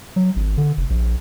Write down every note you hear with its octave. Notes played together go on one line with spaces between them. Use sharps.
F#3
G#1
D3
F1
A#1